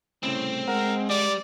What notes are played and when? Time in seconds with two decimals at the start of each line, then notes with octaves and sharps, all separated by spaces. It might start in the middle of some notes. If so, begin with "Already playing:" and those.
0.23 C2 A2 C#3 C4
0.68 G#3 A#4 F#5
1.10 G3 D5